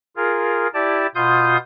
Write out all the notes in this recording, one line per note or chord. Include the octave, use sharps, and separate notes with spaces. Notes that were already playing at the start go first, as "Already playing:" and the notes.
F4 G#4 A#4
E4 G4 D5 A5
B2 F4 C6 D#6 G6